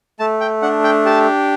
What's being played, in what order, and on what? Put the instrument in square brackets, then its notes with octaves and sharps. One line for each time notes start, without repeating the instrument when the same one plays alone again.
[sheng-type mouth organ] A3 A5
G5
D4 F#5
G5
G4 A5